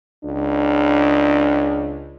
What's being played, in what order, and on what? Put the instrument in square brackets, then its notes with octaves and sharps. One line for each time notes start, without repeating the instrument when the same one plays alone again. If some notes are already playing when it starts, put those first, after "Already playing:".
[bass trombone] C#2 [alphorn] D4